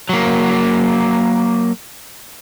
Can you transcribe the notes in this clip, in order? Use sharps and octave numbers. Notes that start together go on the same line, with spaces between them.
F#3 A#3